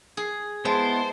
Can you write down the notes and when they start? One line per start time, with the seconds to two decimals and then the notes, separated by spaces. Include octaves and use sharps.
0.17 G#4
0.65 G#3 B3 E4 C5 A5